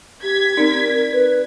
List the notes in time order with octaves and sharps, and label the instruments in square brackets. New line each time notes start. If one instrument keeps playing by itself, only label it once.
[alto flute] G4 [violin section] G#6 B6
[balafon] C4 D#4 [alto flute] A#4 [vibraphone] D5
[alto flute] B4